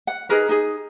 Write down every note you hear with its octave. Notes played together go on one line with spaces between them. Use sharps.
F#5
D#4 G#4 A#4 B4
D#4 G#4